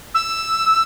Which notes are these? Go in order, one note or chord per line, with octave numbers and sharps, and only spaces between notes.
E6